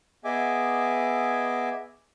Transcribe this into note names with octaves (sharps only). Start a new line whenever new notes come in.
B3 G#4 D#5 E5 G#5 D6